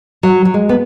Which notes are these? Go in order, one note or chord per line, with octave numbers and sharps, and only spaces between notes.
F#3
F#3
G#3
B3